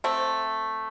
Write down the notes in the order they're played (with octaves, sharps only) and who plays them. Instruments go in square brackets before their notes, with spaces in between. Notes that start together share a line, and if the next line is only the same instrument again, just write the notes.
[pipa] A3 C4